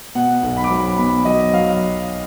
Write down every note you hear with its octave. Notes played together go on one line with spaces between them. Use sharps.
B2 F#5
B1
B5
D6
F#3 B5
B2 B5
F#3 D#5
F#3 F5